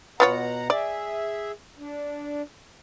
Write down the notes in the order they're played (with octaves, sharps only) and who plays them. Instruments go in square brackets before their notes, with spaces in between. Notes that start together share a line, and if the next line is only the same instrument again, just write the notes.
[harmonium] B2 F#5 A#5 [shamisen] B3 F4 C#5
[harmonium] G#4 E5 [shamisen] D5
[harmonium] D4